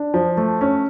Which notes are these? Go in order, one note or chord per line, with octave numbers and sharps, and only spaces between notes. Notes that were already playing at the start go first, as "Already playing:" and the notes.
Already playing: D4
F3
A3
C#4